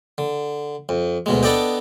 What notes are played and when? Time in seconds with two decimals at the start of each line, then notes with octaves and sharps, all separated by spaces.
0.18 D3
0.89 F2
1.26 D2 B2 G#3
1.43 B3 D4 A4 D5 D#5 G5